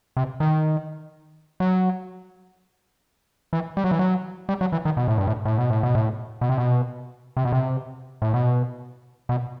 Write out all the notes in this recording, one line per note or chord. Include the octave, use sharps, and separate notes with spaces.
C3
D#3
F#3
E3
G3
F#3
E3
F#3
G3
F#3
E3
D#3
B2
A2
G2
A2
A2
B2
A2
B2
A2
B2
C3
B2
C3
B2
C3
A2
B2
B2